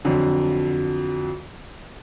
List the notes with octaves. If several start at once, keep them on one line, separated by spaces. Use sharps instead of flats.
F2 D3 F#3